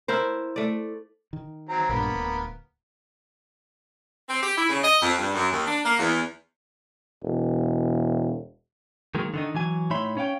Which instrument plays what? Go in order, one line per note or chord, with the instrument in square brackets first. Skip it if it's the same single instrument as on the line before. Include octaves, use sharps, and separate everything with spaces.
[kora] E4 A#4 C5
A3 D5
[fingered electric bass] D#3
[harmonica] F#3 C4 A#5
[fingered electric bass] A#1 G2 [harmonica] A#3 B3
[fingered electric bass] D1
[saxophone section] C4
G4
E4
C#3
D#5
F2
G2
F#2
D#2
D4
A#3
E2
[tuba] E1
[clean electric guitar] D#3 F#3 G#3 A#3
D3 D#3 D#4
E3 F#3 G#5
A2 D#4 C#5 E5 B5 C6
C#4 C#5 F5 G5